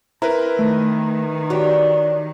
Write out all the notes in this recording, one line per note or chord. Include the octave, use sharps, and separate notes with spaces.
C4 E4 A#4 B4 A#5
D#3 A3
D4 F#4 G4 C#5